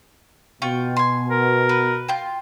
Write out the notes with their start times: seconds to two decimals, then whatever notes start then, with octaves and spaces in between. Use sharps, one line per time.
0.62 B2 F4 G5 C#6
0.97 G#5 C6
1.31 A#4
1.69 B4
2.08 F4 G5